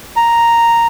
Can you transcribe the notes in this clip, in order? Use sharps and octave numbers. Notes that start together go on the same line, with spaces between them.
A#5